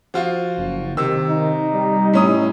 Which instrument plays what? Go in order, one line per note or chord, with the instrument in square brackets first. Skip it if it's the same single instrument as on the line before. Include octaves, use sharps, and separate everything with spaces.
[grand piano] F3 F4 F#4
[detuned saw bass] F#1
[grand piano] C3 E6 [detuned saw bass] D#3
[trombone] D#4
[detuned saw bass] G3
[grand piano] A2 C#4 D#6